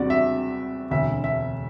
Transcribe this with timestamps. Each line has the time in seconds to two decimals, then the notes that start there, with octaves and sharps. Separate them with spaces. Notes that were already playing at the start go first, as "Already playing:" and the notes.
Already playing: E2 C3 G3 C4 F#4 D5
0.10 E5
0.91 E1 D2 D3 E5
1.24 E5